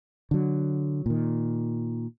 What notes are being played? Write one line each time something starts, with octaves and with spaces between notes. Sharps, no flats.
D3 F#3
A#2 D#3